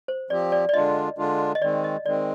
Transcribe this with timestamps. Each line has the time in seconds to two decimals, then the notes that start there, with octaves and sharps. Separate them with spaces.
0.08 C5
0.30 F3 C4 G4 D5
0.52 D5
0.69 D5
0.74 D3 G#3 D4 F4 D#5
1.18 D3 G#3 D4 F4
1.55 D#5
1.61 D#3 G#3 C4 D5
1.84 D#5
2.05 D#3 G#3 C4 D5